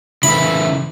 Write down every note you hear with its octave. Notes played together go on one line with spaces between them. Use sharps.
C#3 E3 E4 B5